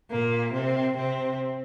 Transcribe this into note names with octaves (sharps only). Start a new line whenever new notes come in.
A#2 A#3
C3 C4
C3 C4